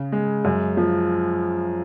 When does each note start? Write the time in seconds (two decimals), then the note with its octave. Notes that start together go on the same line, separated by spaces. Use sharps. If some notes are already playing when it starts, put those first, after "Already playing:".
Already playing: C#3
0.12 G#3
0.45 F#2
0.77 F3